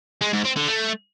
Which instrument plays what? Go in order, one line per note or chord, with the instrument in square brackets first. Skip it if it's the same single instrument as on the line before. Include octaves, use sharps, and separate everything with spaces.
[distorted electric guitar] G#3
G#2
C4
D3
A3